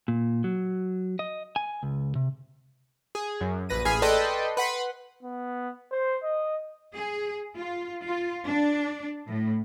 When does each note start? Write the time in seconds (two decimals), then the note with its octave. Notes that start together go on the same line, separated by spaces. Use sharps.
0.08 A#2
0.44 F#3
1.19 D#5
1.56 G#5
1.83 C#2
2.15 C3
3.15 G#4
3.41 F#2
3.69 A#1 B4 A#6 D#7
3.85 A1 G#4 G#5 B5 F6 C7
4.02 A4 B4 D5 D#5 G5 C6
4.57 B4 F#5 B5 C6
5.23 B3
5.91 C5
6.23 D#5
6.94 G#4
7.56 F4
8.05 F4
8.46 D4
9.27 A2